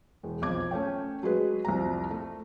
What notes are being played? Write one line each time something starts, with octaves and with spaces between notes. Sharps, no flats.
E1
B1 F2 D6 G#6
A3 C#4 C#5 G5
F#3 G#3 G#4 B4
C2 F2 A#5
A3